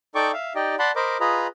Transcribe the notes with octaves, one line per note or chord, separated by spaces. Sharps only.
D#4 A4 D5 G5 C#6 D6
E5 F5
D#4 G4 D5 D#5 G5
D5 F#5 A5 B5 C6
A#4 C5 D#5 B5 D6
F4 G#4 B4 D#5 A#5 B5